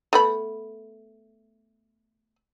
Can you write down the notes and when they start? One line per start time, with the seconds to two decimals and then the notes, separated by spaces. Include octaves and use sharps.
0.13 A3 B3 B5